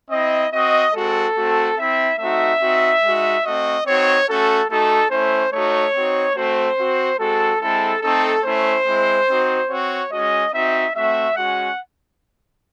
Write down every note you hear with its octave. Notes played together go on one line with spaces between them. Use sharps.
C4 E4 D#5
C4 F#4 D#5
G#3 C4 F#4 A4
A3 C4 F#4
C4 E4 E5
A3 C4 D#4 F#4 E5
C4 D#4 F#4
G#3 D#4 F#4
A3 C4 F#4 D#5
C4 D#4 F#4 C#5
A3 C#4 F#4 A4
A3 D#4 F#4 A4
A3 C#4 E4 C5
A3 D#4 F#4 C#5
C4 D#4 F#4
A3 C4 F#4 C5
C4 F#4
G#3 C4 F#4 A4
G#3 C4 E4 A4
A3 C4 D#4 A4
A3 C#4 E4 C5
G#3 C4 E4
C4 D#4 F#4
C4 F#4 C#5
G#3 C#4 F#4 D#5
C4 D#4 F#4 E5
A3 C4 F#4 E5
G#3 C#4 F#4 F#5